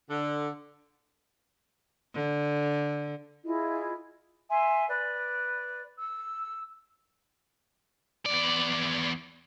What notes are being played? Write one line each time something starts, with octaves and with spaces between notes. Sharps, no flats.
D3
D3
E4 F4 G#4 D#5
E5 G#5 C6
B4 D5
E6
E2 D5